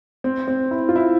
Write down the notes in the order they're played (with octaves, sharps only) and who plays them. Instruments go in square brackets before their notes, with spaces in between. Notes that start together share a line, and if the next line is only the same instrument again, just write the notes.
[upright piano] C4
C4
E4
F4
E4